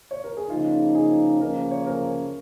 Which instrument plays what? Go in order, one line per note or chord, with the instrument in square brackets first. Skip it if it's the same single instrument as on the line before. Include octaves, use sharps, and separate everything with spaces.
[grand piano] C#5
A#4
G#4
[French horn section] C#3 F3 A#3 D#4 [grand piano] F4
[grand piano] G#4
[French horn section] C#3 F3 A#3 C#4 [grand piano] A#4
[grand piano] C#5
A#4